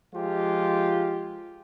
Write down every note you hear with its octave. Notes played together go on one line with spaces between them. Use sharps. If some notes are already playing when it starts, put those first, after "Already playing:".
F3 G#3 F4 G4